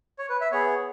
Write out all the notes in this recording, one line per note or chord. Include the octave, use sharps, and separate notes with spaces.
C#5
B4
E5
B3 G#4 C#5